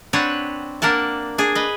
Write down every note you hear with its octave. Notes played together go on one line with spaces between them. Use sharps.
C4 D4 B4 C#5 F#5
A#3 D4 A#4 F#5 A5
D4 G#4
B4 D#5